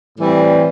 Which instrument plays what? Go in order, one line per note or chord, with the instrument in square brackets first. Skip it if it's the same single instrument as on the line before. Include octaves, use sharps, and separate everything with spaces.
[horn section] A2 E3 G3 C4